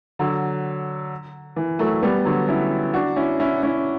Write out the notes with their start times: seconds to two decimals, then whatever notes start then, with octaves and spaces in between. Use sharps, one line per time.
0.19 D3 F#3
1.56 E3
1.79 F#3 A3
2.02 G3 B3
2.25 D3 F#3
2.48 C#4 E4
2.94 D4 F#4
3.16 C#4 E4
3.40 C#4 E4
3.63 C#4 E4